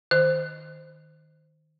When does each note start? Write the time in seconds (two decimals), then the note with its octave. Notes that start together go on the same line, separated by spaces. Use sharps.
0.11 D#3 C5